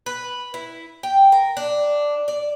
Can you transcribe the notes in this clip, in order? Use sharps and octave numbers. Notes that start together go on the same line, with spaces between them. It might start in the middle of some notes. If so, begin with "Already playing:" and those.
B4
E4
G5
A#4
D4
D5